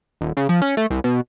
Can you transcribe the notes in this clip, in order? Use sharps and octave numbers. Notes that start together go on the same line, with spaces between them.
D#1
C#3
F3
C#4
A3
C2
B2